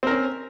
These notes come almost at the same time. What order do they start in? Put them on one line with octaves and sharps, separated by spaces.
C4 A#4 C#4